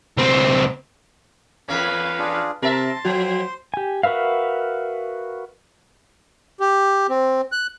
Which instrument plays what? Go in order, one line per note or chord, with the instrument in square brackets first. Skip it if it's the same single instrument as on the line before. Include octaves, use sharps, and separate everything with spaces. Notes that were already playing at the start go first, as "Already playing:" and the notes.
[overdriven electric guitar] C#2 C4
[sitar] E2 A#3 C#4 [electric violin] B4 F5
[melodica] D4 F4 G#4
[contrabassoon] C3 [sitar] A#4 E5 [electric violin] A5 [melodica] C6
[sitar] F2 F3 [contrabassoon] F#3 [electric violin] C5
[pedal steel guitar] G4 G#5
F#4 A#4 B4 E5 F5
[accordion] G4
C4
F#6